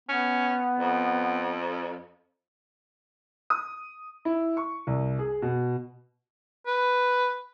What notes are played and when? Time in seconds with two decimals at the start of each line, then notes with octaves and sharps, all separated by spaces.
0.09 B3 C#4
0.79 F2
3.50 D#6
4.25 E4
4.57 C#6
4.87 C2
5.19 G#4
5.42 B2
6.67 B4